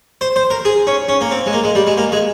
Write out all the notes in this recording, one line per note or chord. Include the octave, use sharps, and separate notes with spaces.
C5
C5
A#4
G#4
C#4
C#4
A#3
C4
G#3
A#3
G#3
G3
G#3
A#3
G#3